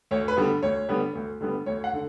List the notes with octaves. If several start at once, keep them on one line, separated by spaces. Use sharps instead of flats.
D2 C#5
B4
D3 G3 B3
D2 C#5
D3 G3 B3
D2
D3 G3 B3
D2 C#5
F#5
D3